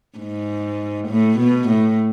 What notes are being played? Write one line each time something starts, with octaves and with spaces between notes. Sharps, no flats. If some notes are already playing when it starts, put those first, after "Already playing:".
G#2
A2
B2
A2